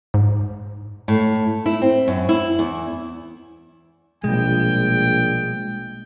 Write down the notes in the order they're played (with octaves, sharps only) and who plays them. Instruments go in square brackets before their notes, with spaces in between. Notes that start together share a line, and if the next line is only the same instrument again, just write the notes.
[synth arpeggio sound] G#2
[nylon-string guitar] A2
E4
C4
F#2
E4
E2
[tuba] A#1 [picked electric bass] B2 G3 [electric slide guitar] G#3 [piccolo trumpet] G5